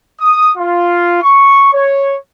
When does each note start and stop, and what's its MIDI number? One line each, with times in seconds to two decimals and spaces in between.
0.20 0.52 87
0.57 1.19 65
1.22 1.73 85
1.74 2.16 73